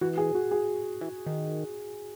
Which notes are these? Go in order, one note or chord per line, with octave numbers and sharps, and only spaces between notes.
E3 F#4
G#4
F#4
G#4
E3
D#3